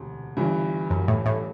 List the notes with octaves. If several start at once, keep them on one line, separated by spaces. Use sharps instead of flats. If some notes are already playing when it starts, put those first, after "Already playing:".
Already playing: E1 D2 C3
G1 G2 E3
F#2
A2
A2